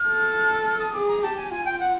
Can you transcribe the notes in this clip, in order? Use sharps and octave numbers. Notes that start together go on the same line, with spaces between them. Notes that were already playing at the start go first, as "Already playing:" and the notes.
Already playing: F6
A4
F6
D#6
G#4 D6
A#5
G4 A5
G#5
F4 G#5
G5
F#5